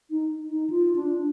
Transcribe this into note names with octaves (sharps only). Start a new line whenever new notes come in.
D#4
D#4
F4
D4